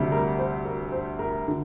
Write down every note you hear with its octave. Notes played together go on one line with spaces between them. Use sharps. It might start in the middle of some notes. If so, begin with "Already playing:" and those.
Already playing: D2 C3 G3
A#4
C5
A#4
C5
A#4
D3